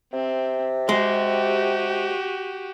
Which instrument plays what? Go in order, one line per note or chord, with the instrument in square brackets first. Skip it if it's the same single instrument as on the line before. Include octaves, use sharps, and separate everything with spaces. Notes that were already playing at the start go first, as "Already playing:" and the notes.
[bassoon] C3 [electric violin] C4
[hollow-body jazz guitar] G#3 [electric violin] F#4 G4